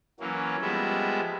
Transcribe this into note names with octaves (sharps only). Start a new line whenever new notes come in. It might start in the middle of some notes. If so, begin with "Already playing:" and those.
E3 F#3 A#3 C#4
F3 G3 G#3 B3 E5